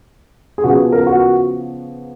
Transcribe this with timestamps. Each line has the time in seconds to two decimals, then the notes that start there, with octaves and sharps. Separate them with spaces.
0.58 G#4
0.64 C#3 F3 B3 F#4
0.92 A#4
1.07 F#4